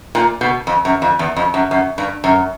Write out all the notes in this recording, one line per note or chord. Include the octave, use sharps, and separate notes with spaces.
A#2
B2
F2
F#2
F2
E2
F2
F#2
F#2
G2
F#2